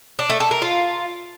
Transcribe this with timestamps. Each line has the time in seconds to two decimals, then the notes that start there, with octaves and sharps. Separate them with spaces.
0.19 D4
0.30 A3
0.40 A4
0.51 A#4
0.62 F4